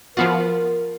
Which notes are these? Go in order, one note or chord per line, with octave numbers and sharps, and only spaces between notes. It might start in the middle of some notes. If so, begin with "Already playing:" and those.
F3 B3 F4 F#4 A#4 F5